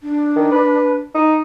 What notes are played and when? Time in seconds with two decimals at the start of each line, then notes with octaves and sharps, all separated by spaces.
0.03 D4
0.35 D#3
0.52 B4
1.14 D#4